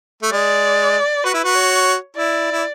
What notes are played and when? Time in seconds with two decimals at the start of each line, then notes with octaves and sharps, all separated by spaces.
0.22 A3
0.32 G#3 D5
1.24 F#4 B4
1.34 E4
1.44 F#4
1.55 C#5
2.16 E4 D5
2.52 E4